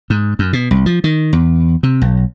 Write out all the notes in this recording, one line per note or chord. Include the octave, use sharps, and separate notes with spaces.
G#2
F#2
B2
C2
F3
D#3
E2
C3
B1